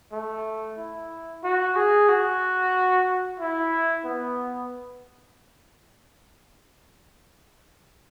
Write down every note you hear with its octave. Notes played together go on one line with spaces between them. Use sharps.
A3
E4
F#4
G#4
F#4
E4
B3